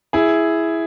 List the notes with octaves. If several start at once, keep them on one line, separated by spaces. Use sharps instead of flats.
E4 G#4